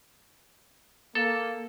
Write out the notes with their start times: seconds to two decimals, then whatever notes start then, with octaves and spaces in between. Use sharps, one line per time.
1.15 A#3 A4